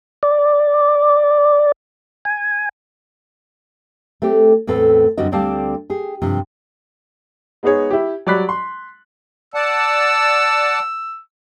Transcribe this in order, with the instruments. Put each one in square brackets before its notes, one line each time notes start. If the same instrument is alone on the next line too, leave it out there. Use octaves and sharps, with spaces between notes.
[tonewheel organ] D5
G#5
[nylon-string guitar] A3 C4 G4
E2 A2 C4 A4 B4
F#2 D3 G3 C4 F#4 D#5
D2 G3 C4 D5 F5 A5
G4 G#4
G2 C3 F3
[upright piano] G#3 B3 D#4 G#4 C#5
E4 G4
F#3 G3 D5 B5 F#6 B6
C6
[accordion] D5 F#5 A5 [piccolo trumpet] E6